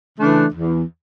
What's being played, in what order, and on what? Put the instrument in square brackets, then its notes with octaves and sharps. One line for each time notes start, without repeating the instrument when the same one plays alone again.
[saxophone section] C#3 E3 A3 D4
E2